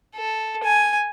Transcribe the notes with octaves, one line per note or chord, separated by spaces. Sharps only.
A4
G#5